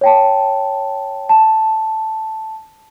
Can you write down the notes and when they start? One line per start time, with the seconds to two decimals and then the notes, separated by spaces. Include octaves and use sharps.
0.01 C#5 G5 A5
1.29 A5